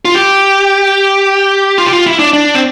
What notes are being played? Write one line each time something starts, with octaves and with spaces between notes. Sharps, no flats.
F4
G4
F4
G4
F4
E4
D4
D4
C4